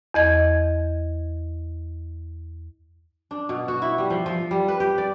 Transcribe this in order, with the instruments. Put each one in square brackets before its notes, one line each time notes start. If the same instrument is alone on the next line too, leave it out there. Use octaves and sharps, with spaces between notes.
[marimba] E2 D#5 G#6
[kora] D4
B2
F#4
E4
G3
F3
F3
G3
B4
G4
D5